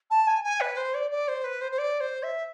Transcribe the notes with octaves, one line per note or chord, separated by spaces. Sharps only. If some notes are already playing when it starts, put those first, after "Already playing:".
A5
G#5
G#5
B4
C5
D5
D5
C5
B4
C5
C5
D5
C5
E5